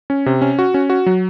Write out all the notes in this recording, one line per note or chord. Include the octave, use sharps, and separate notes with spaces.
C#4
C3
C#4
F#4
C#4
F#4
F#3